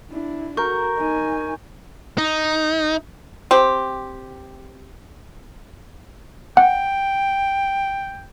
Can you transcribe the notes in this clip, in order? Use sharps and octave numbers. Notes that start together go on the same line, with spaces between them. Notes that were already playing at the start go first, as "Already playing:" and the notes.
D4 E4
F#4 A#4 C#6 G6
D#4 G#5
D#4
C4 G4
F#5 G5